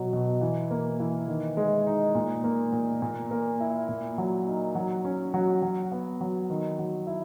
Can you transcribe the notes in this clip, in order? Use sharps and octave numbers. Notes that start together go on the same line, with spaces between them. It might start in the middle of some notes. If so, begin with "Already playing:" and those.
Already playing: B2 F#3
B2
E3
A#3
E3
D#3
G#3
D#4
A#2
A#3
A#2
A#2
A#3
E4
A#2
F#3
D#4
F#3
C#4
F#3
F#3
B3
F#3
D#3
F#3
E4